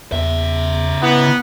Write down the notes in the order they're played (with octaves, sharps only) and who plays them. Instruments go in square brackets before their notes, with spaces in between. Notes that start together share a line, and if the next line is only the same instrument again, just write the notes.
[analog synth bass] E2 [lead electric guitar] C#3 E5
[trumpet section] B3 [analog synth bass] E4